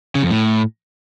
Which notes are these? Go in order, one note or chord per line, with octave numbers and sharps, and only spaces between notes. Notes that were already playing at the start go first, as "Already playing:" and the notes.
C#3
F2
A2